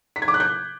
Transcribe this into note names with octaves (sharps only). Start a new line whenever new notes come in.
B6
G#6
D6
F#6
G6